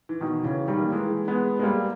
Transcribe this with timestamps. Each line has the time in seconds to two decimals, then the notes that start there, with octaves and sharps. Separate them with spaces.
0.09 E3
0.21 B2 D#3
0.44 C#3 E3
0.68 D#3 G3
0.80 A#3
0.92 E3 G#3
1.28 G#3 B3
1.59 G#3
1.63 G3 A#3